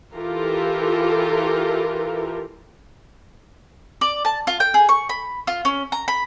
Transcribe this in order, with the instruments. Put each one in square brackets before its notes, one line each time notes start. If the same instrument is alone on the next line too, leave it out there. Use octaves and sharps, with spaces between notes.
[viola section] E3 F4 G4 A4 A#4
[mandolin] D5
A5
F4
G5
G#4
C#6
B5
F4
C#4
A#5
B5